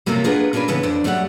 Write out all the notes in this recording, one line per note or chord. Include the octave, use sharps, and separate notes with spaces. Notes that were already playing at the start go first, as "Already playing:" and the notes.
F#2 C3 F3 A3 A#3 F4
D4 F4 G#4 A#4 B4 F#5
A#3 C#4 D4 G#4 A#4 B4
A2 C#3 E3 B3
F2 D3 C5 D5
F#2 G3 A3 G4 A4 F#5